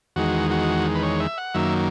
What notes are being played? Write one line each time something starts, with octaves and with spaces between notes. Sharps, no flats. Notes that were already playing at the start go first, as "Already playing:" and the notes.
E2 D#3 G#3 F#4
F#4
B4
C#5
E5
F#5
F#2 D#3 F#3 A#3 E5